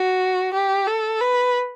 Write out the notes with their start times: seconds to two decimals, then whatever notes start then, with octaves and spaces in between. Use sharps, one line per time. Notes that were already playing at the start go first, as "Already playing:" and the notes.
Already playing: F#4
0.54 G4
0.87 A4
1.21 B4